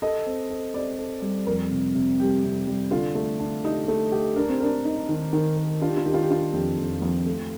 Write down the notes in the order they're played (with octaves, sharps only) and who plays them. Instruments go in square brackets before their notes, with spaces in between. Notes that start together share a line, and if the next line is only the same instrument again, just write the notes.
[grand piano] A4 [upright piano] D#5
[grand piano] C4
A4
[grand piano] C4 [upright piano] D5
[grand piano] A4
G3
[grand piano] F2 [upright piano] A#4
[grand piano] C3
C3
[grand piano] G3 [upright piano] G4
[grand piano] C3
G3
[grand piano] D3 [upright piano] F4
[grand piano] A3
D4
[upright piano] D#4 [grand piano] G4
[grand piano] A3
G4
[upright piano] D4 [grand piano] A#4
[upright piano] C4
[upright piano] D4 [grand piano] A#4
[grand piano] D#4
D#3
D#3
A#4
[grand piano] D4 [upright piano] F4
[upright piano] G4
F4
[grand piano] D#3 [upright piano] G4
[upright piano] F4
G4
[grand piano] D4 [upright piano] F4
[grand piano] F2 [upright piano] G4
[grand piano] F2
F2
A3